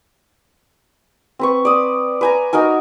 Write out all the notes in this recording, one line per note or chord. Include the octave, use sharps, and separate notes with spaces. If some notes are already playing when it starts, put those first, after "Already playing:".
C4 B4 C#6
D5 D#6
B4 G#5 A#5
D#4 F#4 A#4 G#5